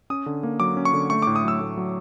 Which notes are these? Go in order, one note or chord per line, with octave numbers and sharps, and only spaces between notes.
C#4 D#6
D3
A#3
F#3 D6
C#4
C#6
D3
A3 C#6
A2 D6
D#6
F#3 E6
A2
F#3